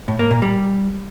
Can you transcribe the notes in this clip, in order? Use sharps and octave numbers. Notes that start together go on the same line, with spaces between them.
A2
A#3
A#2
G3